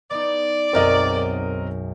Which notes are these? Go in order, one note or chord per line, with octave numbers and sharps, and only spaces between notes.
B3 D#4 D5
B1 F#2 G#3 C4 A#4 D#5